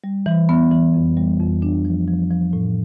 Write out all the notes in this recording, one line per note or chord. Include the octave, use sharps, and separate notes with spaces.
G3
E3
B3
E3
F2
G3
F2
D4
F3
F3
F3
A2